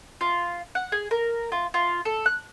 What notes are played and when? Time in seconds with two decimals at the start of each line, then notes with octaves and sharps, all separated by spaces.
0.21 F4
0.75 F#5
0.92 G#4
1.11 A#4
1.52 F4
1.74 F4
2.05 A4
2.26 F#6